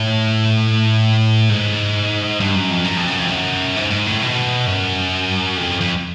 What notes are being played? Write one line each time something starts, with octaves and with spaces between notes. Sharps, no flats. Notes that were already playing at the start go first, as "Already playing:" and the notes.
Already playing: A2
G#2
G2
F#2
F2
F#2
F2
F#2
F2
F#2
G#2
G#2
A2
B2
F#2
F2
F2